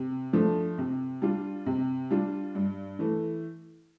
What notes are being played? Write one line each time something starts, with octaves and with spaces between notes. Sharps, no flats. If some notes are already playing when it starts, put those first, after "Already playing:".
Already playing: C3
F3 A3 D4
C3
G3 D4 F4
C3
G3 D4 F4
G2
E3 A3